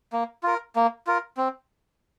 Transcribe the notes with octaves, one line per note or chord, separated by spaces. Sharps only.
A#3
F4 A#4
A#3
F4 A#4
C4